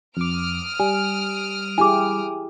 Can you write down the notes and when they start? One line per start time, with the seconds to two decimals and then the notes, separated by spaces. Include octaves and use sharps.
0.17 F2 D6 D#6 F6 D7
0.80 G3 G#5
1.78 E4 G4 G#4 G#5 D6